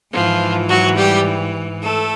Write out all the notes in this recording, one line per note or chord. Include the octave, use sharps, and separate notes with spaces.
G#2 E3 F3 F4
F#3 F#4
G3 G4
A3 A4